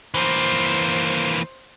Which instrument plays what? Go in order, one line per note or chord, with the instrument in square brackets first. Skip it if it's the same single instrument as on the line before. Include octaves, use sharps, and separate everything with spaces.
[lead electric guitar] E3 A#3 [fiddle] C5